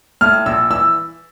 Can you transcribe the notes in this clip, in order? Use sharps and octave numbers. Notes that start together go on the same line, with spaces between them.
A2 F6
A#1 E6
E3 E6